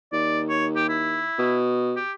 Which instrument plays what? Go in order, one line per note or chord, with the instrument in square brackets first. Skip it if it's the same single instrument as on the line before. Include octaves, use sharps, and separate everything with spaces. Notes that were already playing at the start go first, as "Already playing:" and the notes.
[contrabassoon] D#2 [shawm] D5
[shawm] C#5
G4
E4
[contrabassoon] B2
[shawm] G4